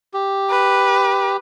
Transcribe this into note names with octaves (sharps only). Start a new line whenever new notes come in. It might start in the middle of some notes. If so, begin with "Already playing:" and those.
G4
B4